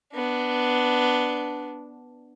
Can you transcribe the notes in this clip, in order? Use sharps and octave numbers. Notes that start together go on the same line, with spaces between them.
B3 D4